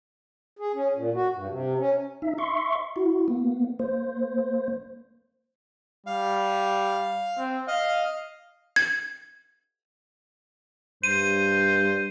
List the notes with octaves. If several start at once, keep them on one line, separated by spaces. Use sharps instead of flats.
G#4
C#4
A#2
F#4
G2
C3
C#4
D#4 E5
E5 C6 C#6
E4 F#4
A#3 B3
A#3 C5
G3 F5
C4
D#5 F5
G#6
G2 C5 D#7